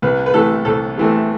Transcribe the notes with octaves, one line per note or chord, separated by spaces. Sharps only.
C2 B4
B4
C3 E3 A3 A4
C2 A4
C3 E3 A3